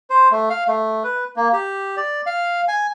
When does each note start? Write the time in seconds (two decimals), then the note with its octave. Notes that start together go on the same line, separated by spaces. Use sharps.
0.10 C5
0.32 A3
0.50 F5
0.68 A3
1.04 B4
1.37 A#3
1.53 G4
1.97 D5
2.26 F5
2.68 G#5